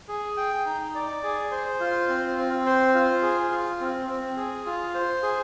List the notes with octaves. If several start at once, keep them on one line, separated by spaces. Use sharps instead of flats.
G#4
G5
D#4
D5
G#4
C5
F4
C4
C4
C5
F4
G#4
F4
C4
C4
G#4
F4
C5
G#4